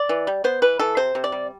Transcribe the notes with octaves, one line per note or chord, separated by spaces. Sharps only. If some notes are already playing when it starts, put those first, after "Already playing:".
Already playing: D5
E3
G3
B3 C5
E3 B4
E3 A4
C3 C5
C3
D5
G3